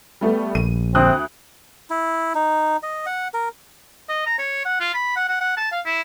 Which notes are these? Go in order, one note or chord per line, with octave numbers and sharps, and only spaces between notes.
G3 A3 B3
A#1 D#7
D2 C4 D#6 F#6
E4
D#4
D#5
F#5
A#4
D#5
A#5
C#5
F#5
F4
B5
F#5
F#5
F#5
A5
F5
E4